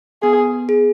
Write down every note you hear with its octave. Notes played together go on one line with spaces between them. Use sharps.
B3 G#4
G#4